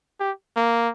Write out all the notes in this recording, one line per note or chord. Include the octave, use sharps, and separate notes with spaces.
G4
A#3